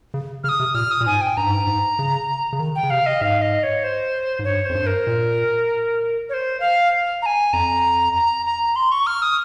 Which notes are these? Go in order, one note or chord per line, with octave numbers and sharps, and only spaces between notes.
C#3
C#3 F6
D#6
C3
A#2 F6
D#6
A#2
G#2 G#5
G5
G2 A#5
G#2
G2
G#2
C#3
C#3
D#3
G5
C#3
C3 F5
D#5
G#2 F5
D#5
C#5
C5
G#2
G2 C#5
F2 C5
G2
A#4
A#2
C#5
C5
F5
A#5
G#5
F2 A#5
A#5
A#5
C6
C#6
F6
D#6